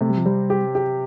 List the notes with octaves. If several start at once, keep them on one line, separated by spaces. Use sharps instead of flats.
C3 A3
G3
F3
G3 C4
G4
G4